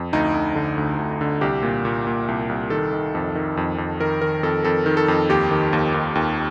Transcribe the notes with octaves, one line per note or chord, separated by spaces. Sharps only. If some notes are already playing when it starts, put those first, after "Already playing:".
Already playing: F2
D2 D#4
D2
D3
D2
D2
D3
C2 G4
A#2
A#2
A#2
C2
C2
D#3 A4
D#3
F2
D#3
F2
F2
D#3 A#4
D#3 A#4
F2 A4
F2 A4
D#3
A4
F2
D#2 G4
D#3
D#2
D#2
D#2